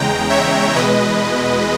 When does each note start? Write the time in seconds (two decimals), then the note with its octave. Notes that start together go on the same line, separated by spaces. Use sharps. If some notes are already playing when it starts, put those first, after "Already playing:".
Already playing: E2 C#3 G#3 G5 A#5
0.30 C#5 E5
0.75 E2 B2 G#3 B4 D#5